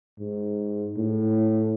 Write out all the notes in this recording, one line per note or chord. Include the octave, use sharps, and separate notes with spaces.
G#2
A2